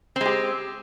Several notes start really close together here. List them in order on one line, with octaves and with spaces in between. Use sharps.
C4 G#3 G4